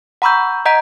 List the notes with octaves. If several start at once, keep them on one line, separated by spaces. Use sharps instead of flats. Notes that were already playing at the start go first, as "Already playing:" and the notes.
F#5 A#5 B5 C#6 E6 G6
D#5 F#5 A#5 G6 B6 D7